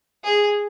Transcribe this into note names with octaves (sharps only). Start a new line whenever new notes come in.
G#4